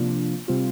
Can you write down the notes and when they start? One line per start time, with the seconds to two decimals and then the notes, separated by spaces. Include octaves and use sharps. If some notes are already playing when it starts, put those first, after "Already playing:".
Already playing: C3 F3 A#3 D4 F4
0.48 C3 G3 C4 F4